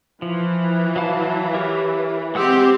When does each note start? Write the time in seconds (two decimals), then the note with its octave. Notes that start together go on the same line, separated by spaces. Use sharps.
0.22 E3 F3
0.96 F#3 F5 A5
1.54 G4 A#4 C#5
2.35 G#3 C4 G4 F#5 E6